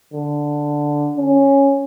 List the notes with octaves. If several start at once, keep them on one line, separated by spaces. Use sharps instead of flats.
D3
C#4